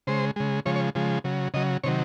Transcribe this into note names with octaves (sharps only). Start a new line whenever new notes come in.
C#3 G#3 C5
C#3 G#3
C#3 F3 G#3 C#5
C#5
C#3 F3 G#3
C#3 F#3
C#3 F#3 D#5
C3 D#3 F#3 C#5